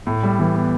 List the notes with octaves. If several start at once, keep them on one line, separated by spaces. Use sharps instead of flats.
A2
G3
E3
B3